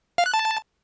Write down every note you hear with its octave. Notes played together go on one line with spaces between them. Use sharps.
F5
F#6
A5